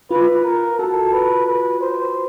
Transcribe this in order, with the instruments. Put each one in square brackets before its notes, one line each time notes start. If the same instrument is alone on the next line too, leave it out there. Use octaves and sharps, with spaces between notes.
[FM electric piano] F4 [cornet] B4
[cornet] A#4
[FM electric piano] F#4 [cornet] A4
[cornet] B4
B4
C5